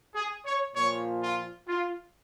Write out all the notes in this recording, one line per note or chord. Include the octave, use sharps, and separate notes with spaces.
G#4
C#5
A#2 F3 C#5
F4
F4